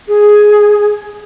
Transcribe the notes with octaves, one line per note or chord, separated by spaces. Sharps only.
G#4